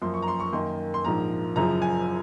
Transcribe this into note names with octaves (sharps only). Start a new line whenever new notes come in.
F#2 F3 A#3 C6
C#6
A#5
C6
C#6
F#2 D#3 A#3 C6
C6
A#1 G#2 F3 A#3 A#5
F#1 F#2 C#3 F3 A#5
G#5